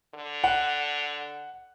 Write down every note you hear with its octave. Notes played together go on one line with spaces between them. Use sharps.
D3
F#5